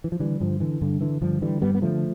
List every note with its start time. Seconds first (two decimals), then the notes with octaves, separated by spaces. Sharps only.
0.04 E3
0.12 F3
0.20 D3 E3 G3
0.40 G2 D3 F3
0.60 D3 E3
0.81 G2 D3
1.01 D3 E3
1.22 G2 D3 F3
1.42 D3 E3 G3
1.62 G2 G3 B3
1.75 B3
1.82 D3 F3 A3